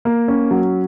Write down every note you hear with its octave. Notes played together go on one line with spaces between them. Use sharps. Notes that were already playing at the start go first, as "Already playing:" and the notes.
A#3
C#4
F#3